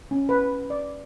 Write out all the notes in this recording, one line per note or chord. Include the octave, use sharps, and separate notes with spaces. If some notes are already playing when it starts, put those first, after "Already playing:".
C#4
B4
D5